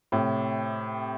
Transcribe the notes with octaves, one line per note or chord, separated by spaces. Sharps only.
A2 C3